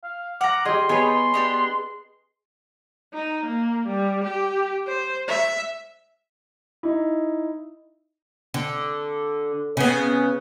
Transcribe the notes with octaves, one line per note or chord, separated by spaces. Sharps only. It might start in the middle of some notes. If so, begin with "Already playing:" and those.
F5
F#5 A#5 D6 F6 A#6
G4 G#4 D#5 C6
B3 G#4 B4 C#5
C6
B3 D4 G4
D#4
A#3
G3
G4
C5
E5
D#4 E4
D3
C#3 B3